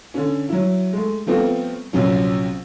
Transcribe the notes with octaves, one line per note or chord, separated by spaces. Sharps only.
D3 C#4
F#3 E4
G#3 A3
F3 G3 A3 B3 C4 F4
A#1 C3 F#3 C#4